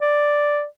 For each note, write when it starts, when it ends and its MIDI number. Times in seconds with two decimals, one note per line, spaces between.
0.01 0.65 74